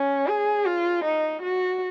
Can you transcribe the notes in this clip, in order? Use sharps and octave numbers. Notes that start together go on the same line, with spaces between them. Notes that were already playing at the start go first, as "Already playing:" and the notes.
Already playing: C#4
G#4
F4
D#4
F#4